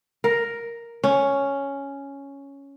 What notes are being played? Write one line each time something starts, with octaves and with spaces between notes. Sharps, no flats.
A#4
C#4